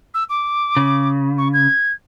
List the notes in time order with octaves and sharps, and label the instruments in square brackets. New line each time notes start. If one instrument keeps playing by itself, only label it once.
[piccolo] E6
D6
[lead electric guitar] C#3
[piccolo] C#6
G#6